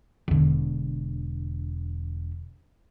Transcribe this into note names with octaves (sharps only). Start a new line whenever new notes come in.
E1 D3